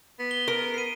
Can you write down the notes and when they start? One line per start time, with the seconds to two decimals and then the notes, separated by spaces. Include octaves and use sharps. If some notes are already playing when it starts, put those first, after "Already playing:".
0.19 B3
0.31 G7
0.48 A#4
0.74 C7 D#7